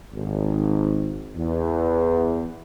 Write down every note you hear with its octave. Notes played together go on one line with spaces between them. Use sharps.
G#1
E2